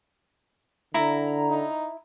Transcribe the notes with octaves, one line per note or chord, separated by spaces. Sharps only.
D3 E4 A#5
D#4